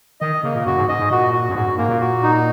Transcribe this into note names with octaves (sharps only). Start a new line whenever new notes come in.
D#3 D#5
C#3 A#3
A#2
F#2 F#4
G#2
G#2 D#5
G#2
A#2 F#4
F#4
F#2
G#2 F#4
F#2
G#2 A#3
A#2
F#4
D#4